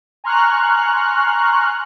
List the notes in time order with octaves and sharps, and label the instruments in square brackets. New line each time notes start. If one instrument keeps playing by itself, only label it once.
[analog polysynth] G#5 A#5 C6 C#6 F6 F#6